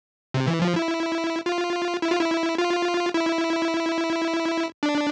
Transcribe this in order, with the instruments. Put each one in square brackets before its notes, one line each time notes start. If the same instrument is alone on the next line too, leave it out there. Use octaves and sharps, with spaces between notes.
[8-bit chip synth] C3
E3
F3
E4
F4
E4
F4
E4
F4
E4
D4